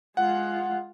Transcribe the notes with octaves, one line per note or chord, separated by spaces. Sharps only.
G#3 F4 F#5